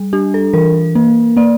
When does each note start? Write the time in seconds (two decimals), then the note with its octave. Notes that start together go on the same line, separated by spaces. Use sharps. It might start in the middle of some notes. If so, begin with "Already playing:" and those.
Already playing: G3
0.13 D4 G4
0.34 A4
0.54 E3 A#4
0.95 A#3
1.37 A#3 D5